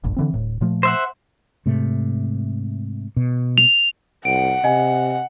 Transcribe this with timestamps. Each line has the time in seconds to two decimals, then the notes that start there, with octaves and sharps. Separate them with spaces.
0.04 F1 A#1 G2
0.16 D3 E3 C4
0.34 D1 A2
0.61 A#2 F3 A3
0.83 C5 E5 F#5
1.66 G#2 C3 A3
3.17 B2
3.58 F7
4.25 C2 F#5 D7
4.64 C3 D#5 G#5